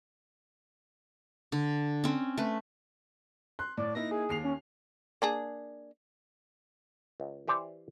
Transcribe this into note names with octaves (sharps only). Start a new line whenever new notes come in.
D3
C4 C#4
A3 B4
C6 F#6
A2 D5
A#3 D#4 E4 A#6
G#4
D#2 C7 F7
C#4
A#3 D4 G#4
C#2
E3 G4 C5 D5